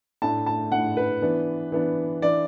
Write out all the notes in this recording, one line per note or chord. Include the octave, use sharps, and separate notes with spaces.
A2 A3 D4 A5
A5
A2 A3 D4 F#5
B4
E3 B3 D4
E3 B3 D4
E3 D4 D5